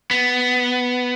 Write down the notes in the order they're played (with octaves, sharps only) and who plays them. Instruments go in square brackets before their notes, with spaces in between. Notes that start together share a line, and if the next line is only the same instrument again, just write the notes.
[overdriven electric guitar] B3